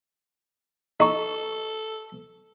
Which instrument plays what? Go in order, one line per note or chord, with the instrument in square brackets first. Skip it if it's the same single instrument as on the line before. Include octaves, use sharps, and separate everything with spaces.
[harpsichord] D#4 C#6 [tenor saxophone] A4